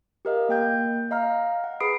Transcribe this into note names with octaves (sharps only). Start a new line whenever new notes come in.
G4 A#4 D#5 F5
A#3 G5 G6
D#5 F5 A#5 F6
F#5
G#4 B4 B5 D#6 C7 D7